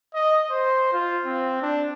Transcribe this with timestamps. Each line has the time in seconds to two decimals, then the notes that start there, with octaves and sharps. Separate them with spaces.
0.14 D#5
0.51 C5
0.93 F4
1.26 C4
1.62 D4